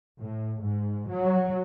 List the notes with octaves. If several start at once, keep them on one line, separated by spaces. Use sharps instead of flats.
A2
G#2
F#3